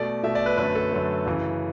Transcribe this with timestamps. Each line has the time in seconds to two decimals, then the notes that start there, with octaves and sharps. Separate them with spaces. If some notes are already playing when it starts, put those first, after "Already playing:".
Already playing: B2 A3 D5
0.23 B2 A3 E5
0.35 D5
0.46 B4
0.57 F#2 D3 F#3 A3 B4
0.75 A4
0.92 F#2 D3 F#3 A3
1.26 F#2 C#3 E3